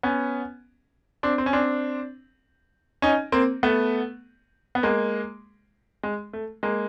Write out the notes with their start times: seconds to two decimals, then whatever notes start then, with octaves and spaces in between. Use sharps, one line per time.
0.03 B3 C#4
1.23 C4 D4
1.38 C4
1.46 C#4
1.53 C4 D4
3.02 C#4 D#4
3.32 A#3 C4
3.63 A3 B3
4.75 B3
4.83 G#3 A#3
6.03 G#3
6.33 A3
6.63 G#3 A#3